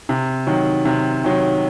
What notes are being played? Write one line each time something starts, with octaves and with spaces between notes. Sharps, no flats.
C3
D#3 F#3
C3
D#3 F#3